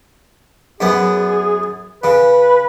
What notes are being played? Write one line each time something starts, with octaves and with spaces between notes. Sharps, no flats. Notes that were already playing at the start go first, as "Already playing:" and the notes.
F#2 B3 G#4
C#3 B4